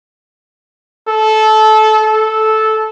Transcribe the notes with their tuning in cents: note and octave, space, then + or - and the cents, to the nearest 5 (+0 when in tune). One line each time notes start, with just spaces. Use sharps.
A4 -20
A4 -10